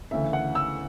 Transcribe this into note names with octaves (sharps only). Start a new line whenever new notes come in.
D2 C#3 E3 E5
F#5
E6